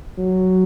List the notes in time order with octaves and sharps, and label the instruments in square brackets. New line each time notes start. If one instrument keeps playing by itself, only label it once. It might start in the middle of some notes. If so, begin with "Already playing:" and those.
[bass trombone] F#3